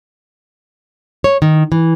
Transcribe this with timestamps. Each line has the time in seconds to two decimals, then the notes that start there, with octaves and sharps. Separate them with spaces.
1.24 C#5
1.42 D#3
1.72 E3